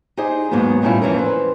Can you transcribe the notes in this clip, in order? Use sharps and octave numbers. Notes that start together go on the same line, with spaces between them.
D#4 G4 G#4 C5 D#5
D#2 G#2 F#3 A#3 B3
A2 G3 A3 C#4 E4 F4
F2 E3 C#4 A#4
B4 C5